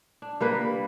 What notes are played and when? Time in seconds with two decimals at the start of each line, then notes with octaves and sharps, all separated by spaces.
0.22 D4
0.40 G3 A#3 B4